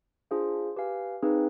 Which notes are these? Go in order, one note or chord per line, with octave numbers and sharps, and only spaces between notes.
D4 F4 G#4 C5 F5
G4 B4 F5 G#5
C4 D#4 G#4 B4 F5